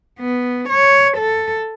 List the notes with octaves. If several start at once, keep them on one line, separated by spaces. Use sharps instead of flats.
B3
C#5
A4